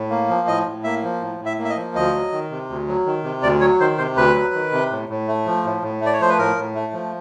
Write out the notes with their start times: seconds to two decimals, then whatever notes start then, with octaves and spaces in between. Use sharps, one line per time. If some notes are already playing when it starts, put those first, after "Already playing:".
Already playing: A2
0.10 A#3
0.29 F3
0.48 A2 D#5
0.66 A2
0.84 A#3 E5
1.02 F3
1.21 A2
1.40 A2
1.46 E5
1.59 A#3
1.64 E5
1.70 D#5
1.76 F3
1.95 D2 D#5
2.13 F#3
2.32 D#3
2.51 C3
2.70 D2
2.88 F#3
3.06 D#3
3.24 C3
3.43 D2 D5
3.61 F#3 C#5
3.80 D#3 C5
3.98 C3 C5
4.17 D2 B4
4.34 F#3
4.54 D#3
4.72 C3
4.91 A2
5.09 A2
5.28 A3
5.46 F3
5.64 A2
5.82 A2
6.01 A3 D5
6.13 C#5
6.20 F3 C5
6.29 B4
6.38 A2 A#4
6.56 A2
6.75 A3
6.93 F3